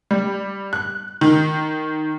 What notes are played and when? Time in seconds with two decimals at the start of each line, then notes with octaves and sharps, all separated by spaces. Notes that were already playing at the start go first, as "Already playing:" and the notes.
0.11 G3
0.73 F#6
1.21 D#3